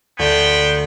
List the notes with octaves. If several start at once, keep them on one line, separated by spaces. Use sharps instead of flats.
D2 B3 A4 C5 G5